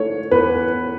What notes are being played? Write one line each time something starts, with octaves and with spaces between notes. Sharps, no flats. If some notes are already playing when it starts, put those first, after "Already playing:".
Already playing: A3 C#5
E2 B4